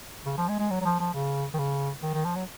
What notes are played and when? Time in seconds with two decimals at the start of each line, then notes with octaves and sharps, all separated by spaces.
0.26 C#3
0.37 F3
0.48 G#3
0.59 G#3
0.70 F#3
0.81 F#3
0.85 F3
1.00 F3
1.14 C#3
1.54 D#3
1.59 C#3
2.03 D#3
2.14 D#3
2.25 F3
2.36 F#3